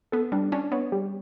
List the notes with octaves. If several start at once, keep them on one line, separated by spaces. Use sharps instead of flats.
B3 A4
G3 D4
C#4 D4
B3 C#5
G3